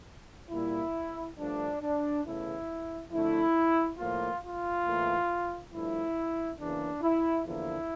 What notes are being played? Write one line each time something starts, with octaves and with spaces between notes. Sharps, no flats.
A#2 G3 A#3 E4
G2 F3 A3 D4
D4
E2 C#3 E3 A3 E4
F2 D3 A3 E4
A2 F3 A#3 F4
F4
A2 E3 A#3
G2 F3 A3 E4
E2 C#3 E3 A#3 D4
E4
E2 D3 F3 A#3 E4